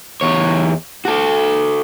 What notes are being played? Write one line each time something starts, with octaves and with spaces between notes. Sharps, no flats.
E2 C#5
F#4 A4